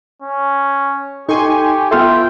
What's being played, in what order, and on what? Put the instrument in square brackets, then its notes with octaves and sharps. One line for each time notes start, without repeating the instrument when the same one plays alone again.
[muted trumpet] C#4
[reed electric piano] D#4 A4 [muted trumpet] G4 [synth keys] G#5 C6 C#6
[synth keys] B3 F4 A4 [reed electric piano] E5 C6 F6 [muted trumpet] G5